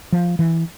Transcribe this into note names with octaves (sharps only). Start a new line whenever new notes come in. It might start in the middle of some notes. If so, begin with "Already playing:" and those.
F3
E3